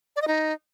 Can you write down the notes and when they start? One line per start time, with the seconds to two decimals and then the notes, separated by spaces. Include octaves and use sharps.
0.16 D5
0.22 D#5
0.28 D#4